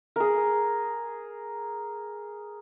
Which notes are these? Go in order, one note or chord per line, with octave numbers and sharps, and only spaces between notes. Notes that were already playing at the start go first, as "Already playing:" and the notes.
G#4 A#4